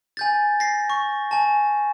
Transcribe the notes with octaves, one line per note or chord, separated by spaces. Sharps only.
G#5 G6 A6
A#6 C7
C#6
G#5 A5